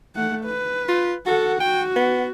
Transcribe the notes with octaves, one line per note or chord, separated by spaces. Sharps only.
A3 F#5
B4
F4
F#4 A4 F#5
F#4 G5
B3